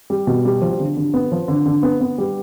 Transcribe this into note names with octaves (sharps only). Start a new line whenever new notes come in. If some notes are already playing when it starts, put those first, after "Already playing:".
G3
B2
G3
F3
D3
D3
B3
F3
D3
D3
B3
B3
G3